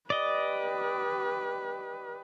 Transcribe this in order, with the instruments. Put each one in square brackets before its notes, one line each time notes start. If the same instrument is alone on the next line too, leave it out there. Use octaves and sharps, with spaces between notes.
[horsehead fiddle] G4 B4 [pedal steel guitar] D5 D#5